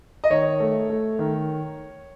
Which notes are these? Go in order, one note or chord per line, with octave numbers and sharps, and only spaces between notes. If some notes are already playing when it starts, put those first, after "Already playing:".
D#5
D#3 C#5
A3
A3
D#3